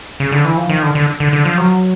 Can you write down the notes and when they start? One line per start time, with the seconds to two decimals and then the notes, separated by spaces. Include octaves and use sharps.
0.20 C#3
0.32 D3
0.45 E3
0.57 F3
0.69 D#3
0.83 D3
0.95 D3
1.20 D3
1.33 D3
1.45 F3
1.58 F#3